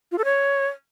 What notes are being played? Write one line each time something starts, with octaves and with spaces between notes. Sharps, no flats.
F4
A4
C#5